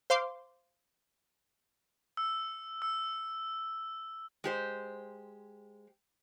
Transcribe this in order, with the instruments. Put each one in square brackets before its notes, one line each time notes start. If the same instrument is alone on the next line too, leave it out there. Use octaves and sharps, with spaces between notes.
[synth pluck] C5 F5 C6 D6
[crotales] E6
E6
[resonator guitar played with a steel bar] G#3 G4 C5